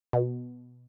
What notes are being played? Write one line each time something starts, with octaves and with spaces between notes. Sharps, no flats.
B2